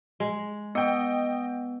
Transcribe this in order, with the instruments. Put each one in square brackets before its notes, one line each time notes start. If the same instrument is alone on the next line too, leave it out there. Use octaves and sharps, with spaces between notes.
[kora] G#3
[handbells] B3 [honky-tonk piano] D#5 G5